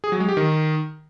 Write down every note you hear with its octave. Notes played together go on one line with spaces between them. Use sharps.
G#4
F#3
G#3
G4
D#3